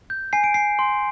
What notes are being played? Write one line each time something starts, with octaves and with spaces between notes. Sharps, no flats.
G6
G#5 C7
D7
G#5 C7
C6